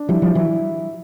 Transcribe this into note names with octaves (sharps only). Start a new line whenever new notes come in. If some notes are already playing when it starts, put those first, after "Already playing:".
Already playing: D4
F3 G3 E4
F3 G3
E3 F#3 E4